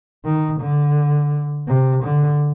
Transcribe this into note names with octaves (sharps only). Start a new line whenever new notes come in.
D#3
D3
C3
D3